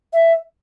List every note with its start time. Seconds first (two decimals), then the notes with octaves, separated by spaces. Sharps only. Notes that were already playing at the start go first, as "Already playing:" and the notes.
0.13 E5